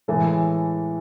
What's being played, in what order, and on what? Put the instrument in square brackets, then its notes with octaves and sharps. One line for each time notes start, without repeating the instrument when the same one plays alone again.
[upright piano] A2 E3 G#3 A4